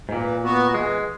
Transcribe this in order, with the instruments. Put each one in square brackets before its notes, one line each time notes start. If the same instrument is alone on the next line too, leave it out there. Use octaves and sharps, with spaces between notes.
[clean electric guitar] G#2
[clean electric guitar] A#2 [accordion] E3
[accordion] B3 F#4
[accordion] E3 [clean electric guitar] G#3